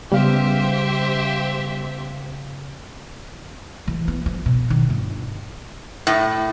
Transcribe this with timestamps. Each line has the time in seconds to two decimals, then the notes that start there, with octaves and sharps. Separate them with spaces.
0.12 C#3 G3 B3 G4 C5 E5 F5
3.87 E3
4.08 B3
4.26 F3
4.46 B2
4.70 D#3
4.90 G1
6.07 A2